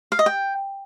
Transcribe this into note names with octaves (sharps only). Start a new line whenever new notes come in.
F5
D#5
G5